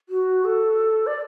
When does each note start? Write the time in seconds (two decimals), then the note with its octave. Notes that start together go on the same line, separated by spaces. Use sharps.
0.09 F#4
0.45 A4
1.07 D5